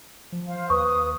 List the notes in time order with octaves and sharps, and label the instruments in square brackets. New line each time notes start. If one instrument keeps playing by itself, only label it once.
[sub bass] F3
[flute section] C5 F5
[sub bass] D#2 [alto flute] B4 [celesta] C#6 [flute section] D#6